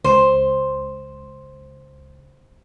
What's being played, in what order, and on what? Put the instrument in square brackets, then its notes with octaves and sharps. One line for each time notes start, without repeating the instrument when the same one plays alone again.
[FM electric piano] C#2 [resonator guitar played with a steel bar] C5